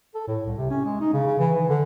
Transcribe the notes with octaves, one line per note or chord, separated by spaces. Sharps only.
A4
A2
C2
C3
C#4
G#3
D#4
C#3
C#3
E3
E3
D3